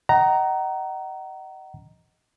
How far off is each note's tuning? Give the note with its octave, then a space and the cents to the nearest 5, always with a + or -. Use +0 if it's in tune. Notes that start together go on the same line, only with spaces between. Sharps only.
D#5 +0 F#5 +40 A#5 +0